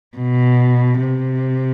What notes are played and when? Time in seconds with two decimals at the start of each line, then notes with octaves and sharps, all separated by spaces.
0.17 B2
1.04 C3